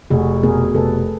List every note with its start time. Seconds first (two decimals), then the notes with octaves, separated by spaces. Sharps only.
0.10 F1 F#4 G#4
0.43 B2 G#4 A#4
0.75 F1 A4 B4